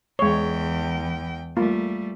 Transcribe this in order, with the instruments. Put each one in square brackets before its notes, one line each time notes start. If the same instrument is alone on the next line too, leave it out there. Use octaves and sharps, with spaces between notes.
[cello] E2 G5 [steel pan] G#3 C#5
[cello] G3 A3 [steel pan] A#3 F4